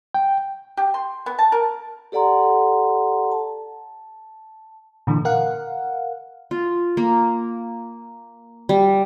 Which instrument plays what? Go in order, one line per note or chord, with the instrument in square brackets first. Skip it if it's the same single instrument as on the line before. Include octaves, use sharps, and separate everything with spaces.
[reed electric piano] G5
[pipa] G4
C6
B3
A5
A#4
[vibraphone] G4 A4 D5 F#5 A#5 C6
A5
[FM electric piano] A#2 D3 E3
A#4 F5 F#5
[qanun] F4
A#3
G3